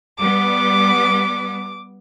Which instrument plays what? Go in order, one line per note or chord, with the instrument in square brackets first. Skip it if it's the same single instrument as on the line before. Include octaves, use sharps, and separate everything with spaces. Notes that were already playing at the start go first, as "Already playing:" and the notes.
[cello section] G3 B3 [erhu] D6